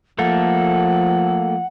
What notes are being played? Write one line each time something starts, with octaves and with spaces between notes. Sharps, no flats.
F3 A3 A#3 A4 F#5